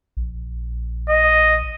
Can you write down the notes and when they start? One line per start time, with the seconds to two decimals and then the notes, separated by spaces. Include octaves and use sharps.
0.17 A#1
1.09 D#5